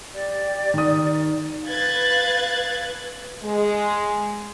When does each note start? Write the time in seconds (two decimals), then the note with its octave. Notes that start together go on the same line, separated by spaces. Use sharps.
0.13 G4 D5
0.74 D#3 D#6
1.68 B4 F5 F#6 G#6 A6
3.43 G#3